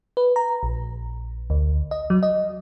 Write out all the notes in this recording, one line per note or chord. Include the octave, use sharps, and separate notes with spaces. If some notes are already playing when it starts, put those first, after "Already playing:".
B4
A#5
A#1
D2
D#5
F#3
D#5